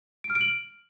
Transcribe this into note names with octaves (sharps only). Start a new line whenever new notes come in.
D7
F6
D7
F#7